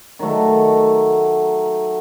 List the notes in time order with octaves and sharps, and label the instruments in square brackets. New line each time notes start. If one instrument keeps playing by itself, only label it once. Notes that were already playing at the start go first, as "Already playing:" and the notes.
[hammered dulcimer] D#3 F#3 A3